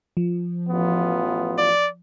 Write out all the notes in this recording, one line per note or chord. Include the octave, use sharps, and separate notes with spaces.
F3
A1 B3 F4
D5